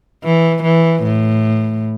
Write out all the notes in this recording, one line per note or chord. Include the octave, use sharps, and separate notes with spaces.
E3
E3
A2